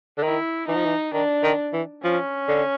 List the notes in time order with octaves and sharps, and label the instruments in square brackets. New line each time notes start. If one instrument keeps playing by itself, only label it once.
[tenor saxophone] D3
[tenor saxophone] D#3 [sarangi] E4
[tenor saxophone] E3 [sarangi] D#4
[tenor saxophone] F3
E3
[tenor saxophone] D#3 [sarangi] D4
[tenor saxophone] D#3
E3
[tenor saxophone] F3 [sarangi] C#4
[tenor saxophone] D3